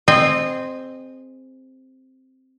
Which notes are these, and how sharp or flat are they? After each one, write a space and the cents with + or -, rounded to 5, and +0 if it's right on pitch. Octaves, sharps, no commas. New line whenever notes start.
C4 +0 G#4 +0 D#5 -25